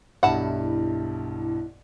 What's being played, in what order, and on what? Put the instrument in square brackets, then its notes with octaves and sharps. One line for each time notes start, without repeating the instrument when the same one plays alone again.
[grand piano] B1 G2 [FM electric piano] E4 [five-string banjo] F#5 A5